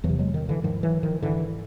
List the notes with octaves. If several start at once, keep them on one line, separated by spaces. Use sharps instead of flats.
E2 E3 F#3
C3
F#3 G#3
D#3
D3 E3
G#2 D#3 F3
E3 F#3
D#3 F3
G#2 D3 E3